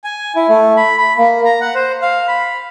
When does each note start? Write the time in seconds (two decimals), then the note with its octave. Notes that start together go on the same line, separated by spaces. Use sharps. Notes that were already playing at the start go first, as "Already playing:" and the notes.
0.04 G#5
0.36 E4
0.49 A3
0.77 B5
0.97 B5
1.18 A#3
1.45 A#5
1.61 F#5
1.75 C5
2.02 F5
2.28 B5